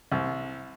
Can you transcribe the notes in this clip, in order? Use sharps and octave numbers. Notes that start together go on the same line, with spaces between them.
C2